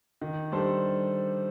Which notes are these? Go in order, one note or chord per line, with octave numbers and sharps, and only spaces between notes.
D#3
G3 D4 A4 C5